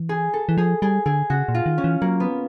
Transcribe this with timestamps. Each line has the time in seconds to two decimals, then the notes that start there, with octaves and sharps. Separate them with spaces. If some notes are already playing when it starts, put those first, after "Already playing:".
Already playing: E3
0.09 G#4
0.34 A4
0.49 E3
0.58 F3 G#4
0.82 G3 G#4
1.06 D3 G#4
1.30 C#3 F#4
1.49 A#2
1.55 F4
1.66 D#3
1.78 C#4
1.84 E3
2.02 F#3 A#3
2.20 B3